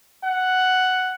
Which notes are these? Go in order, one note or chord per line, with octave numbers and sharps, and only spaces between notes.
F#5